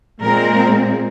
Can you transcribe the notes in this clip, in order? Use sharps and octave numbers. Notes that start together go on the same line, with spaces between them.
A#2 G#3 C4 A#4